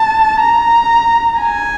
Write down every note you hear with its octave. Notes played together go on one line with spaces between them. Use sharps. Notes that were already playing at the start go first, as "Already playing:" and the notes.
Already playing: A5
A#5
G#5